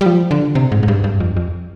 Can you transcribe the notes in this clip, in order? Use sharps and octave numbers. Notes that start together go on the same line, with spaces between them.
G3
F3
D3
C3
G#2
G#2
G2
G2
F2
F2